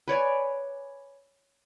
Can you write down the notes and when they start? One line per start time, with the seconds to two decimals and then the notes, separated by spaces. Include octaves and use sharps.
0.08 B4 C#5 D5 G#5